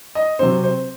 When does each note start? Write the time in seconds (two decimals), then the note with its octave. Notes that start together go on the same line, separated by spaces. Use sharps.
0.15 D#5
0.39 C3 F#3 C4 C5
0.64 C5